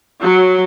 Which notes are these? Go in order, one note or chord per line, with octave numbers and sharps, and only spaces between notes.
F#3